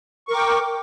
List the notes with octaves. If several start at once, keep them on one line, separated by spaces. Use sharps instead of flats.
A#4 G5 C#6 D6